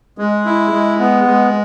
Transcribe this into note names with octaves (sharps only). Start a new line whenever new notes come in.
G#3
E4
G#3
B3
G#3